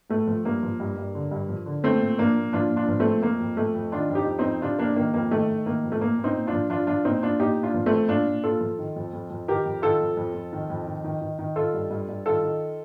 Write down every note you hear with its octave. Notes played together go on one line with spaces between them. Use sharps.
A2 A3
F3
G2 A#3
F3
G2
G2
D3
G2
F3
D3
A#2 A3 C4
A#2
F3 A#3 D4
A#2
F3 D4 F4
A#2
D4 F4
F3
A3 C4
A#2
F2 A#3
F2
F2 A3
F2
D#3 D4 F4
F2
D#4 G4
F2
C4 D#4
F2
C3 D4 F4
F2 A#3 D4
D#3 A#3
F2 A#3
D#3 A3
D#3
D#3 A#3
F2
A3
A#2 A#3
A#2
C4 D#4
A#2
D4 F4
F3
F3 D4 F4
F3 D4 F4
A#2 C4 D#4
A#2 D4 F4
A#2 D#4 G4
A#2
D4 F4
F3
F3 A3 C4
A#2 D4 F4
A#2
A#2 F4 A4
F3
D#3
F2
F2
F2
D#3 G4 A#4
F2
D#3 F4 A4
F2
F2
F2
D#3
F2
D#3
D#3
D#3
D#3
D#3 F4 A4
G2
G2
G2
D#3 F4 A4
D#3